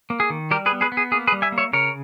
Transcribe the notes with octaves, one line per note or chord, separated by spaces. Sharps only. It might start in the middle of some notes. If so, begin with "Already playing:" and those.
A#3
G#4
D#3
G3 G4 A#4
G#4 B4
B3
G#4 B4
B3
G#4
A#3 G#4
G#4 B4
G3
E5 G#5
A#3
C#5 E5
C#3 A#4 C#5